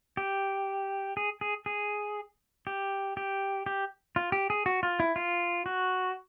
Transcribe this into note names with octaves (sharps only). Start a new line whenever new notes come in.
G4
G#4
G#4
G#4
G4
G4
G4
F4
G4
G#4
F#4
F4
E4
F4
F#4